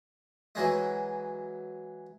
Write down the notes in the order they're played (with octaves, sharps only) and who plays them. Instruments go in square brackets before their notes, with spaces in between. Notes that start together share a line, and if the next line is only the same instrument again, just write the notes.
[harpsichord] E3 F#3 G#3 D#4